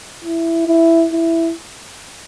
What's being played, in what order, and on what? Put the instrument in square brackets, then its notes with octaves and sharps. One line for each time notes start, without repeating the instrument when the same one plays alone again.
[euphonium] E4
E4
E4